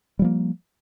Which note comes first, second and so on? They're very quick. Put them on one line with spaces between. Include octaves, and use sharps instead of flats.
G3 F3 A#3